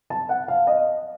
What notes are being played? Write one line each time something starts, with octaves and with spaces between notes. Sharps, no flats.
A5
F#5
F5
D#5